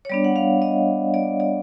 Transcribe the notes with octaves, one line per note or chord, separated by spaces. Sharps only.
C#5
G3 B3 D4 D5
F#5
F5
D#5
D5
D5